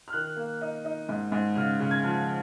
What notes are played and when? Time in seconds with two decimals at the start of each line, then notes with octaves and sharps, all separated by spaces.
0.08 F6
0.13 D#3 F#6
0.36 A#3
0.61 D#4
0.85 D#4
1.09 G#2
1.32 G#2
1.56 C#3 F6
1.80 C#3
1.91 G#6
2.04 F3